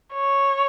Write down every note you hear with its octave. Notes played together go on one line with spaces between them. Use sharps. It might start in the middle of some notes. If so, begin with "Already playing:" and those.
C#5